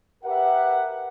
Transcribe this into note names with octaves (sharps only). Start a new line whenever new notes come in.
G4 A#4 B4 E5 F#5